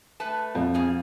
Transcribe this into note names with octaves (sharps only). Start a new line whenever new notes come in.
A3 B4 A5
F2
B2 G#4 F5